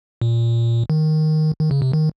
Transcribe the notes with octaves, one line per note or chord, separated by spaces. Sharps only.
A#2
D#3
D#3
C#3
C3
D#3